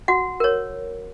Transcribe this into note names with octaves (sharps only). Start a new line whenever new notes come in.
F#4 F#5
A#4 C#5